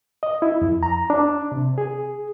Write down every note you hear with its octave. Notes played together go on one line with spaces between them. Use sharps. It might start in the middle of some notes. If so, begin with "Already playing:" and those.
D#5
E4
F2
A#5
D4
C3
G#4